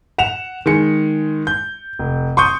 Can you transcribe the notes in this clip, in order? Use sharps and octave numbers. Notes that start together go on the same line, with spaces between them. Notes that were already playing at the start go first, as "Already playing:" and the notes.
F#5 E7 F7
D#3 G#3 C#7
G6
F1
C6 C#6 D#6 G6